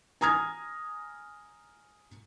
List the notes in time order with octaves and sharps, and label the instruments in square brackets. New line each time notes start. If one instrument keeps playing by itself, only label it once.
[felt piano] G#5 A#5 D#6 F6 G#6